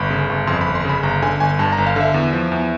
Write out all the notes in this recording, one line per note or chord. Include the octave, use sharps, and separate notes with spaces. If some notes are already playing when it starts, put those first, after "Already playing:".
Already playing: G1 B5
C#3
G1
F2 C6
B5
G1
C6
C#3 B5
G1 A#5
D3 G#5
G1 G#5
G2 A5
A#5
G1
F5
D3 E5
E2
F3
E2